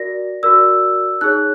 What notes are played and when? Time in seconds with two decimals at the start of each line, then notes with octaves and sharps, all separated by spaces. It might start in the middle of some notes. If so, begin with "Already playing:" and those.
Already playing: F#4 A#4 D5 A#6
0.43 F#4 A#4 D5 E6
1.21 D#4 G#4 C#5 F#6